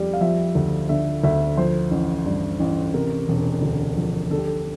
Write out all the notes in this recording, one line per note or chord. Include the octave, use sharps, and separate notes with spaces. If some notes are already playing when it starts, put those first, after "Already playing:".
Already playing: F2 G3
F5
F3 E5
D2
D3 E5
D2 E5
F3 C5
A1
G2
A1
C3 A#4
E1
D2
F3
D3 A4
G4
A4